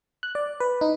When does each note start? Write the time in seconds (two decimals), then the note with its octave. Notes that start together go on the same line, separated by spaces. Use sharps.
0.23 F#6
0.35 D5
0.60 B4
0.81 D#4